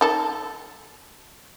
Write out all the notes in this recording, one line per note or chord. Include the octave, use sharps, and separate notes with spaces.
D#3 A4 A5